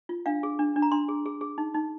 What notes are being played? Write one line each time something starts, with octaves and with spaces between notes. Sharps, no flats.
F4
D4 F5
G#4
D4
D4
A#5
D4 C6
G#4
G#4
G#4
D#4
D#4